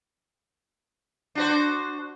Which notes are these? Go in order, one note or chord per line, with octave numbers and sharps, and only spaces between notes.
D4 F#4 C5